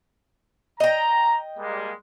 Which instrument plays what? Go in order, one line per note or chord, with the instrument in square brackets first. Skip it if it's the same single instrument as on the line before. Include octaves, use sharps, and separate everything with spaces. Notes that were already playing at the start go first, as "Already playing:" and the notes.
[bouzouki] D#5 G5 [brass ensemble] A#5
[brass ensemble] G3 G#3 A#3